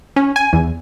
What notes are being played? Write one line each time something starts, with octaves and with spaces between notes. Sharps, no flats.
C#4
G#5
E2